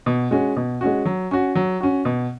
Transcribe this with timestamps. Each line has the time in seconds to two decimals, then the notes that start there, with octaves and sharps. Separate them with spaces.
0.06 B2
0.31 G#3 C#4 F#4
0.56 B2
0.81 G#3 C#4 F#4
1.05 F#3
1.31 C#4 F#4
1.55 F#3
1.81 C#4 F#4
2.05 B2